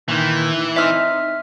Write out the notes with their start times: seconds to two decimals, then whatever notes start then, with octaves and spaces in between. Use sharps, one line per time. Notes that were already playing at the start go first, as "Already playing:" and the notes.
0.08 A#2 D#3 E3
0.76 C4 D#4 E5 F6